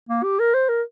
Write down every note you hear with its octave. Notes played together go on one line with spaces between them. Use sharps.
A#3
G4
A#4
C5
A#4